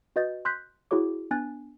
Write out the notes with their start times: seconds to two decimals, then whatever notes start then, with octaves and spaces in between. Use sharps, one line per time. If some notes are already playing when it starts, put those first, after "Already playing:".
0.16 F#4 B4 D#5 G6 A6
0.45 C6 F#6 G6 B6
0.91 E4 F#4 G#4 C#5 D6
1.31 B3 D4 G#5 F#6 A6